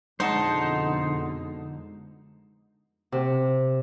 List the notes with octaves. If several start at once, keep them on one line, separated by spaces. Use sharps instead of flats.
F2 B2 D3 G#3 D#4 C5 F#5 A5
C3